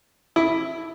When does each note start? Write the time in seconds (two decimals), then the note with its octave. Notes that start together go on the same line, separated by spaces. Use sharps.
0.36 E4